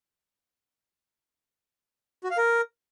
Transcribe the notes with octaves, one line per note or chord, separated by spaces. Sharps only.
F#4
F5
A#4